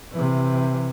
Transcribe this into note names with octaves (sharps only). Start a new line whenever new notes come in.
C3 E3